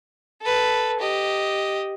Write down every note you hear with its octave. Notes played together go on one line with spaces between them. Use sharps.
A4 B4
G4 D#5